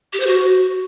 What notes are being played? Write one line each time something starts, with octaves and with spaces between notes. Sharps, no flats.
G4
C5
F#4